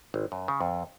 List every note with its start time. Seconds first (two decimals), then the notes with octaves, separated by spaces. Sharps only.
0.14 G#1
0.32 F#2
0.48 C#3
0.61 F2